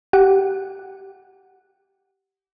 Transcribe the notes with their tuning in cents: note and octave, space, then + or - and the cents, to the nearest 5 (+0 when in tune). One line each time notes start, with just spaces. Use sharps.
G4 -15 F#5 +0